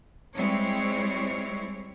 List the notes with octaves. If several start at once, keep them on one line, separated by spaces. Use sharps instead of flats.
G3 G#3 C4 E4 C#5